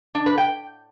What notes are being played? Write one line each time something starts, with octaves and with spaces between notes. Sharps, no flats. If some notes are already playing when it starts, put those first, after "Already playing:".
D4
B4
G5